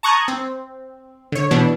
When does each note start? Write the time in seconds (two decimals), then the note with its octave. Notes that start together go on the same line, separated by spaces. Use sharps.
0.03 A5 A#5 C#6 D#6 F#6 G#6
0.28 C4
1.32 D3 C#5
1.51 B2 E3 B3 D4